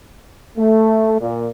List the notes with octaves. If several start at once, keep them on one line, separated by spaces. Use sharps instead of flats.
A3
A#2